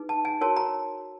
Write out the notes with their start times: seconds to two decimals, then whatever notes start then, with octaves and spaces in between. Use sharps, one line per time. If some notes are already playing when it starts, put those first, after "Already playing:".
Already playing: D#4 G#4 B4
0.09 A5
0.25 G#5
0.41 F#4 A#4 C#5 A5
0.56 A#5